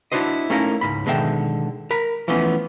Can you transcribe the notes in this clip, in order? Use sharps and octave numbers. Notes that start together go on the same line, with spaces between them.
D4 E4 F#4 C5 D#5
A3 A#3 C#4 D#4 E4 A#4
C#2 G#2 B5
B2 D3 D#3 G#3 E5 G5
A#4 B5
E3 F3 A3 B3 C#4